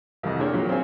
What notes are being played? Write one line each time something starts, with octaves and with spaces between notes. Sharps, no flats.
C2 F2 D#5
G#3 A#3 D4 C#5 D5 G5
A#2 F3 F#3
C4 G#4 C#5 F5 G#5